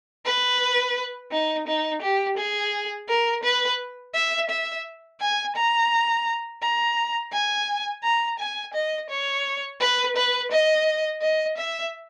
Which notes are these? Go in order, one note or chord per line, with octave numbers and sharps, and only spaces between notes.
B4
D#4
D#4
G4
G#4
A#4
B4
E5
E5
G#5
A#5
A#5
G#5
A#5
G#5
D#5
C#5
B4
B4
D#5
D#5
E5